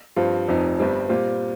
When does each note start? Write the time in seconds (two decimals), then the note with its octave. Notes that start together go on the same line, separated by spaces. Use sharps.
0.16 G2 F3 C4 F4
0.48 F1 F2 F3 D#4
0.79 G1 G2 G3 C4
1.09 A#2 G3 C4 F4